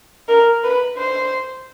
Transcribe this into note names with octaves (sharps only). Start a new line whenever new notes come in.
A#4
B4
C5